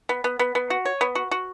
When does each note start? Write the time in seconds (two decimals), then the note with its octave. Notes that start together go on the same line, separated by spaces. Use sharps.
0.09 B3
0.24 B3
0.39 B3
0.55 B3
0.70 F#4
0.85 C#5
1.01 B3
1.15 F#4
1.31 F#4